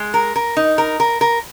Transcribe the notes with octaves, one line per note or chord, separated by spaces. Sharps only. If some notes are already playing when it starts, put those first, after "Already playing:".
Already playing: G#3
A#4
A#4
D#4
A#4
A#4
A#4